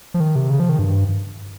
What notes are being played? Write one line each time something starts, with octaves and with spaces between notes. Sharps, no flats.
F3
D#3
C3
C#3
F3
D#3
G2